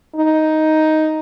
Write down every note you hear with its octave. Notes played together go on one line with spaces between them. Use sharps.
D#4